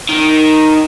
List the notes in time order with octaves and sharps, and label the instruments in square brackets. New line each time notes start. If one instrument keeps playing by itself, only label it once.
[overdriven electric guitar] D#3